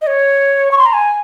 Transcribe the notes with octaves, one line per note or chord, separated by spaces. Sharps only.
D#5
C#5
C#6
C6
A#5
G#5